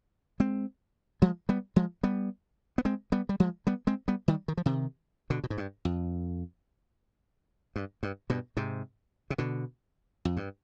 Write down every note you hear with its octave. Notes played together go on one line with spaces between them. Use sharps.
G#3 C4
F3 G#3
G3 B3
F3 G#3
G3 B3
B3
G#3 C4
G3 B3
G3
F3 G#3
G3 B3
G#3 C4
G3 B3
D#3 G3
D#3
F3
C3 D#3
B2 D3
B2
G#2
G2
F2
G2
G2
G2 B2
G#2 C3
C3
B2 D3
F2
G2